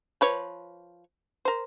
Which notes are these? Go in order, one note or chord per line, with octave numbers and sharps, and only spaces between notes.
F3 B4 C#5
A#4 C5